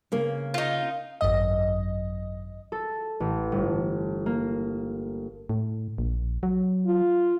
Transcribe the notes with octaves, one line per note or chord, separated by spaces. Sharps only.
C#3 A#3
D#4 F4
G#1 F#2 D#5
A4
A1
G1
A#3
A2
A#1
F#3
F4